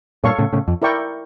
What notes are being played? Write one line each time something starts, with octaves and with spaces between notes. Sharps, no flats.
G2 A#2 A4 C#5 F5 C#6
A2 C#3
A2 C#3
F2
E4 A#4 D5 G5 C#6